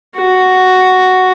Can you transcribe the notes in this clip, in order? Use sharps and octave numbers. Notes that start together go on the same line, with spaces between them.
F#4